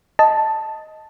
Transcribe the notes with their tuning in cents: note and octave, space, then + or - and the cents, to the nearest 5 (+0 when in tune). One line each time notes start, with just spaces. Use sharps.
D#5 +10 A5 +0